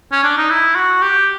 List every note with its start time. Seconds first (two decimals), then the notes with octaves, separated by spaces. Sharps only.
0.12 C#4
0.24 D4
0.37 D#4
0.50 E4
0.75 F#4
1.02 G4